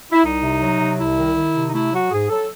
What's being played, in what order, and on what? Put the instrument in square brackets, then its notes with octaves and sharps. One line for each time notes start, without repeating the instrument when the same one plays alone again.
[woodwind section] E4
C2 D#4
C3
F#3
C3
C2 E4
D#3
D#3
C3
D#4
A3 E4
F#3 F#4
G#2 G#4
F#3 A4